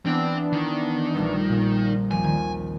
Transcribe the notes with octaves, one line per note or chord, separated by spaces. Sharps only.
E3 B3 C4 D4 C5 G5
D#3
A#1 G3 A3
A#2
D#2 F3 C4 G#5
D#3